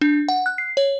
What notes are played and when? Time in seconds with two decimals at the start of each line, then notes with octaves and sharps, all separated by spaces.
0.01 D4
0.28 F#5
0.46 F#6
0.58 C7
0.77 C#5